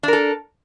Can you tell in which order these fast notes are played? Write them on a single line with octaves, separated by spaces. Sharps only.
D4 A#4 A4